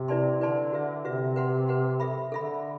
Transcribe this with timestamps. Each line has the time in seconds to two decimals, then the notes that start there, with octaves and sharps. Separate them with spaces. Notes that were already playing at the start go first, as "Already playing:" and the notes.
Already playing: C3
0.08 E4 B4 D5 A5 C6
0.40 D3 E4 B4 D5 A5 C6
0.72 F#4 B4 E5
1.04 C3 F#4 B4 E5
1.36 B4 F#5 C6
1.68 B4 F#5 C6
2.00 A4 E5 B5
2.32 D3 A4 E5 B5